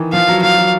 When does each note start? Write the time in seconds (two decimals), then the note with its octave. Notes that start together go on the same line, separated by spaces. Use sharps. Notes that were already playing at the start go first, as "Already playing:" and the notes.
Already playing: D#3 E3
0.13 F3 F5
0.28 F#3
0.42 F#3 F5
0.58 F#3